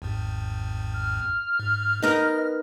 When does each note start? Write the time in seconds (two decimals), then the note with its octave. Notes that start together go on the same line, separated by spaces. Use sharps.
0.02 G#1 E2 G#2
0.94 F6
1.60 G#2
2.02 B3 D#4 A#4 D#5 A#6